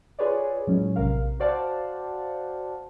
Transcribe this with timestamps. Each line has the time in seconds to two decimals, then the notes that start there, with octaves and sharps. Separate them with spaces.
0.19 F4 G#4 B4 C#5 D5
0.67 A2 F#3 G#3 C#4
0.96 A#1 C3 A#4 F5
1.40 F#4 C5 D5 F5 F#5 A5